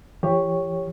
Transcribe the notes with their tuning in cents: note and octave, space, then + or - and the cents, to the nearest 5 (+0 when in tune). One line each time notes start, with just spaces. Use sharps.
E3 +45 G4 +15 C#5 +0